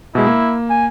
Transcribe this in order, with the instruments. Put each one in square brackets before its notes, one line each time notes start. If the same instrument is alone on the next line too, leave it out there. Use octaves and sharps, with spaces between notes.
[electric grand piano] B2 G#3 [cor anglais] E4
[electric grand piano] A#3
[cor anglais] G#5